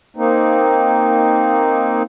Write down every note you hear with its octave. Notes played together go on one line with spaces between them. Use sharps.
A#3 C4 D#4